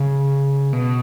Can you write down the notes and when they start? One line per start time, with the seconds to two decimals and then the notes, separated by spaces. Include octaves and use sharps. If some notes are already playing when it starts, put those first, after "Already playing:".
Already playing: C#3
0.73 B2